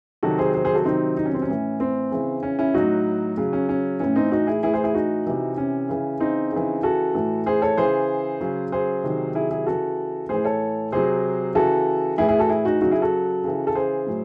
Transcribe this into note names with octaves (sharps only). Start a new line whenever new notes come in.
C3 D#3 F#3 F#4 A4
G#4 C5
G#4 C5
G#4 C5
F#4 A4
C3 D#3 F#3 C4 D#4
D#4
C#4
C4
C#4
A2 E3
C4
C#3 E3
C#4
C#4 E4
A2 F#3 D#4 F#4
C#3 F#3
C#4
C#4
A2 E3 C#4
C4 D#4
D#4 F#4
E4 G#4
A2 E3 E4 G#4
G#4 C5
E4 G#4
D#4 F#4
C3 E3
C#4
C#3 E3
C4 D#4
C#3 E3
F#4 A4
A2 E3
G#4 C5
A4 C#5
C#3 E3 G#4 C5
C#3 F#3
G#4 C5
C3 D#3 F#3
E4 G#4
E4 G#4
C#3 E3 F#4 A4
A2 E3 G#4 C5
A4 C#5
C3 F#3 G#4 C5
C#3 E3 F#4 A4
A2 E3 E4 G#4
E4 G#4
F#4 A4
E4 G#4
D#4 F#4
C#3 F#3 D#4 F#4
E4 G#4
F#4 A4
C#3 E3
A4
G#4 C5
A2 F#3